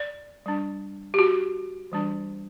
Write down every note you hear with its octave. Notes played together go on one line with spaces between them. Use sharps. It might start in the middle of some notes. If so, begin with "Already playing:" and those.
Already playing: D5
G3 D4
G4
F#4
E3 G3 D4